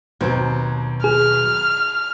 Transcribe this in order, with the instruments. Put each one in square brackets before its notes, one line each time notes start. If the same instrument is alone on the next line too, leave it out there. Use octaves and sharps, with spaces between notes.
[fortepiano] D#2 C4 [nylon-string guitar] B2 F#3
[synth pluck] G#4 [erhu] F6